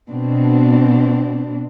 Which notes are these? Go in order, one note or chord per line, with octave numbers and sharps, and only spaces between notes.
B2 C4 D4